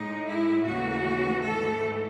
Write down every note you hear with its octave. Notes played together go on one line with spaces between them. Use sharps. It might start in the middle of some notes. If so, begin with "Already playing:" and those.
Already playing: A2 G#3 D#4
E4
D#2 C#3 E3 A3 F#4
G#2 E3 A3 A4